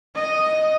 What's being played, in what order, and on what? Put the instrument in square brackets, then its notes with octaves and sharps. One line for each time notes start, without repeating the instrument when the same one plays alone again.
[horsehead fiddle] D#5